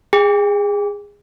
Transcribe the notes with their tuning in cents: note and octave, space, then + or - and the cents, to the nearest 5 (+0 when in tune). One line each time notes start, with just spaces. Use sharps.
G#4 -20 G5 +30